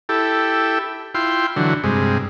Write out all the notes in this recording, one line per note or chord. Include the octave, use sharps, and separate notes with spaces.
E4 G4 A4
E4 F4 G5 C6
D3 E3 F#3
G2 C3 G#3